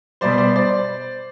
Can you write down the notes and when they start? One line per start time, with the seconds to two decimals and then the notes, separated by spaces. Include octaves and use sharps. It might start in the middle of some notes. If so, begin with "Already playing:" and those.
0.21 B2 G3 C5 D5
0.38 C5 D5
0.56 C5 D5